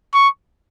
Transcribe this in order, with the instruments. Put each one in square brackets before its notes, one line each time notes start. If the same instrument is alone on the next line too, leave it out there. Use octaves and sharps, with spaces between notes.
[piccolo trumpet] C#6